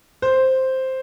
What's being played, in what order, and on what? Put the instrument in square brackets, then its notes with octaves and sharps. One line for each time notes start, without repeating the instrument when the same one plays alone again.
[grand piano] C5